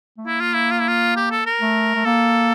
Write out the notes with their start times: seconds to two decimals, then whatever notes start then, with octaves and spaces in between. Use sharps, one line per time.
0.18 A3
0.26 A#3 E4
0.40 F4
0.54 E4
0.71 F4
0.80 E4
0.88 F4
1.16 G4
1.31 A4
1.46 A#4
1.61 A3
1.95 A3
2.05 A#3 A4